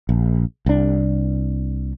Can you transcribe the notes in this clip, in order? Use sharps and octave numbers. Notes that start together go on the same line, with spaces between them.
A#1
C2 D4